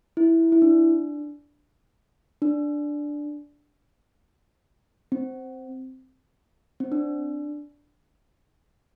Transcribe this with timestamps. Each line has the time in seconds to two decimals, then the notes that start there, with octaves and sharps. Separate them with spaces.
0.17 E4
0.52 E4
0.62 D4
2.42 D4
5.12 C4
6.80 C4
6.92 D4